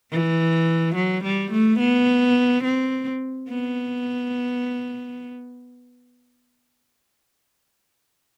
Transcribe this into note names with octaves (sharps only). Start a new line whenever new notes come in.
E3
F#3
G3
A3
B3
C4
B3